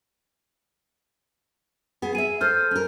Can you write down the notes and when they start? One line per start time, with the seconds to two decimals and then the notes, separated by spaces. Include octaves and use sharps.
2.02 B3 G#4
2.15 G#4 E5 D#7
2.41 A4 C5 F6 G6
2.71 C#4 A#4